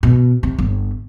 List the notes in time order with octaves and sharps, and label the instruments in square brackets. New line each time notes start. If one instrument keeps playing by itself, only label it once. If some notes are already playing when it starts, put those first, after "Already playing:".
[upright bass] B2
C3
G1